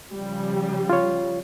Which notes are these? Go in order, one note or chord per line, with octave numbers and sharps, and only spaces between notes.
C#3 F3 G3
F4 C#5